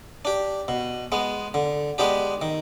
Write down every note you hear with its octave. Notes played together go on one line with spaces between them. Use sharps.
D4 G4
B2
G#3 B3
D3
G#3 B3 D4 G4
D#3